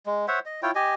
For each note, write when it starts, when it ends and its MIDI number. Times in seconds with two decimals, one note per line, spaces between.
0.06 0.26 56
0.28 0.39 72
0.28 0.39 73
0.28 0.39 76
0.28 0.39 78
0.46 0.61 75
0.63 0.71 64
0.63 0.71 65
0.63 0.71 73
0.63 0.71 79
0.75 0.94 67
0.75 0.94 75
0.75 0.94 80